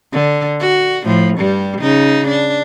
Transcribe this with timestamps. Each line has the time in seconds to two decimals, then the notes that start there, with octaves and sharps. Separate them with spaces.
0.13 D3
0.60 F#4
1.04 A2 F3
1.38 G2 G3
1.80 C#3 D#4
2.27 D4